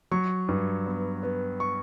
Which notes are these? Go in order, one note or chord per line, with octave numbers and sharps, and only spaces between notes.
F#3 C#6
G2
B3
B3
C#6